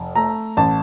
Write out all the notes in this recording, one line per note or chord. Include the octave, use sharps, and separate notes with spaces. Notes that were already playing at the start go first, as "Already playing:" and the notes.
Already playing: F1
A3 A#5
A1 A5